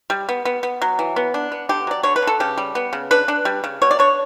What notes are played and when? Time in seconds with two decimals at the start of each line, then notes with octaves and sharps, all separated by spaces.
0.10 G3
0.29 B3
0.45 B3
0.63 B3
0.82 F#3
0.99 E3
1.16 B3
1.34 D4
1.52 B3
1.69 D3 G4
1.87 F#3 D5
2.03 D3 C#5
2.16 B4
2.22 D3
2.27 A4
2.40 C#3 G4
2.58 G3
2.75 B3
2.93 C#3
3.11 D4 B4
3.28 D4
3.45 G3
3.64 C#3
3.82 B2 C#5
3.91 D5
3.99 D4 C#5